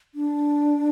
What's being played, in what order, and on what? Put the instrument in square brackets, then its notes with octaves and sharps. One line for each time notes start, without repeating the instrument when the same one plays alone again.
[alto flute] D4